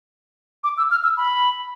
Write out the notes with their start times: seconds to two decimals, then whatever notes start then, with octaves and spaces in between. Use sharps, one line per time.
0.64 D6
0.78 E6
0.91 F6
1.04 E6
1.17 B5